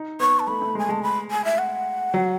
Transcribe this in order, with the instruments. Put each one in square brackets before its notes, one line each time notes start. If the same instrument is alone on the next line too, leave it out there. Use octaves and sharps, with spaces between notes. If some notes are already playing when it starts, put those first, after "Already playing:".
Already playing: [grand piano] D#4
[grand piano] B3 [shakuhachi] C#6
[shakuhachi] A5
[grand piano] A3 [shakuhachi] B5
[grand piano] A3
[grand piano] G#3 [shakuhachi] G#5
[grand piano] G#3 [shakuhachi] A5
[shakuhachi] B5
G#5
E5
F#5
[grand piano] F#3